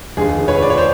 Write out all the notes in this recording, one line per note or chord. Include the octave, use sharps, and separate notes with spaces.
F1 D#2 D3 F3 G#3 G#4
B4 C#5
D5
C#5
C5 D5